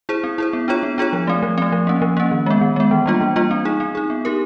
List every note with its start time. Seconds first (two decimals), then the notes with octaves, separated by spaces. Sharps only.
0.09 E4 G#4 C5
0.24 C4
0.38 E4 G#4 C5
0.53 B3
0.68 D4 F4 G#4 C#5
0.83 B3
0.98 D4 F4 G#4 C#5
1.13 F3
1.27 A3 C4
1.43 F3
1.58 A3 C4
1.72 F3
1.87 A#3 C#4
2.02 F3
2.17 A#3 C#4
2.31 D#3
2.46 G#3 B3
2.61 D#3
2.76 G#3 B3
2.91 E3
3.06 G3 A#3 D4 F4
3.21 E3
3.36 G3 A#3 D4 F4
3.51 C4
3.65 D#4 G#4
3.80 C4
3.95 D#4 G#4
4.10 B3
4.25 D#4 G4 A#4